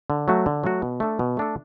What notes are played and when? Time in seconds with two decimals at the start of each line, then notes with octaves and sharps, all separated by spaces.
0.10 D3
0.28 F#3 A3 F#4
0.46 D3
0.64 F#3 A3 F#4
0.82 B2
1.00 A3 D4 A4
1.19 B2
1.37 A3 D4 A4